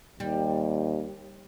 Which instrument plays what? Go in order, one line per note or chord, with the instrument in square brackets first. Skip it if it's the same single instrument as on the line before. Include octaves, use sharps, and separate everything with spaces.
[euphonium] D#2 [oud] G3